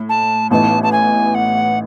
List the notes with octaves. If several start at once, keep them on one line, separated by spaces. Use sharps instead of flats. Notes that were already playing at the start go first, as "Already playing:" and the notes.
Already playing: A2
A5
A1 A2 E3 B3 D#4 A5
A5
G#5
F#5